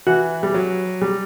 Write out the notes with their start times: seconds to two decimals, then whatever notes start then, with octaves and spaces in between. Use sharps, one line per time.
0.07 E3 F#4
0.43 G3
0.54 F#3
1.02 G3